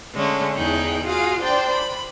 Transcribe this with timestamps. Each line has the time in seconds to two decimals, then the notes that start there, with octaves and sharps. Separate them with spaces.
0.13 D3 G#3 A3 C#4
0.56 E2 D#4 G#4 G5 F#6
1.04 F4 F#4 G#4 F5
1.41 D4 C5 D5 G5
1.72 B5